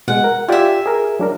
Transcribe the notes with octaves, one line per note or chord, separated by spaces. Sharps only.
B2 G#3 F#5
A#4
F4 G4 D5 E5 G#5
G#4 A#4
F#3 D4 A#4